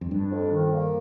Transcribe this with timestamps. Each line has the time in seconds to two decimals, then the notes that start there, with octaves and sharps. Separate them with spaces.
0.01 F2
0.11 G2 D4
0.31 F2
0.51 D#3
0.71 A#3